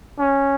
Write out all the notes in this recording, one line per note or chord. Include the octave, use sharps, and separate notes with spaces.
C#4